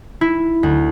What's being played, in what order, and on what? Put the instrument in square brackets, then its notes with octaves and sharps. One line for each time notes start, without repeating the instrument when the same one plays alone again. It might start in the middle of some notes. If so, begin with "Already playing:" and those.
[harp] E4
D2